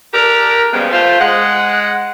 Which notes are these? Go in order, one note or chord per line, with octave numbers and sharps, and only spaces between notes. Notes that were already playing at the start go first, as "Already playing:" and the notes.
D4 G4 A4 A#4
A#2 C#3 F3 G3 G#3 B3
A3 F4 C5
G#3 F#5